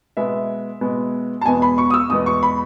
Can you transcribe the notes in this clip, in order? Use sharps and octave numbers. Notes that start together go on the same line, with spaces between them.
B2 G#3 B3 E5
B2 G#3 B3
A5
E2 B2 G#3 B3 G#5
B5
C#6
D#6
E6
E2 B2 G#3 B3 D#6
C#6
B5